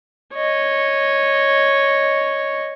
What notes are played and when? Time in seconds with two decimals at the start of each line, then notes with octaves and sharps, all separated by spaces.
0.34 C#5 D#5